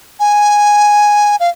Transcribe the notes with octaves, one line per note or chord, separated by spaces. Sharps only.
G#5
F5